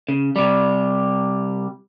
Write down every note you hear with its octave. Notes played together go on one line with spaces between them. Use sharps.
C#3
C3 G3